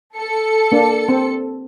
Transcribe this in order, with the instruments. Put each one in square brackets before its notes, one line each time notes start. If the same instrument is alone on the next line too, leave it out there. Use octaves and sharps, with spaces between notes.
[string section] A4 C#7
[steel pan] A#3 D4
C4